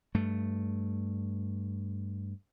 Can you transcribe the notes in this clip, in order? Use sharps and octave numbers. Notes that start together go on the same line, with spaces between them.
G2 A3